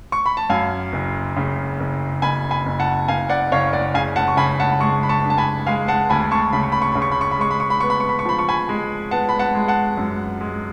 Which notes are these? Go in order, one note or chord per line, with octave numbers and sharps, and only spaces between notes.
C#6
B5
A5
F#2 F5 G#5
F#1
C#3
F#1
F#1 G#5 B5
G#5 B5
F#1
F#5 A5
F#1 F5 G#5
D5 F#5
F#1 C#5 F5
D5 F#5
C#3 F5 G#5
F#5 A5
C#6
C#3 G#5 B5
F#5 A5
G#3 A5 C#6
B5
A5 C#6
D4
A5
G#5 B5
G#3 F5 G#5
F#5 A5
D2 G#5 B5
A5 C#6
C#3 B5
C#6
B5
C#6
C#3 B5
C#6
B5
C#6
B5
G#3 C#6
B5
C#6
B5
B3 C#6
B5
C#6
B5
C#6
F3 B5
C#6
G#5 B5
G#3
B3 F#5 A5
B5
F#5 A5
G#3
F#5 A5
F#2
G#3